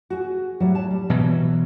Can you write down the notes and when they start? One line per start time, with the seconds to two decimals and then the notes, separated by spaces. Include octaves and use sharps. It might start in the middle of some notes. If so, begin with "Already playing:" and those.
0.10 F#4 G#4
0.60 A2 F#3 G3
0.75 C#5 A5
0.91 G3
1.10 B2 E3 F#3